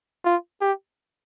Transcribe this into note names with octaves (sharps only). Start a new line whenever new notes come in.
F4
G4